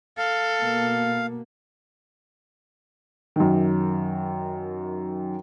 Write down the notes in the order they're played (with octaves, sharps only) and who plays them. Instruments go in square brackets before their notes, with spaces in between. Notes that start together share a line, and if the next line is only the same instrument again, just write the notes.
[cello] A4 [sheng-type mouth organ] F5
[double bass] B2 A#3
[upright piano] F#2 D#3